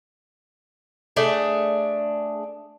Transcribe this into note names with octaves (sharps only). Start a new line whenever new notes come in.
A3 D4 G#4